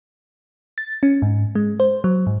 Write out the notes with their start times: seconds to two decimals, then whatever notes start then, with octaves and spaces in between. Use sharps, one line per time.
0.78 A6
1.03 C#4
1.22 G#2
1.55 G#3
1.80 C5
2.04 F#3
2.27 G#2